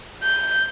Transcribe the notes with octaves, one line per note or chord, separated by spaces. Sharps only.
G6